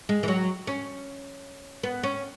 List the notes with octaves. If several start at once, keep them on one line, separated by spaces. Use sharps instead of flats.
G#3
E3
F#3
C#4
B3
C#4